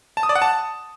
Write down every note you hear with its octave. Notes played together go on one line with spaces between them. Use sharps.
A5
D#6
D5
F#5
A5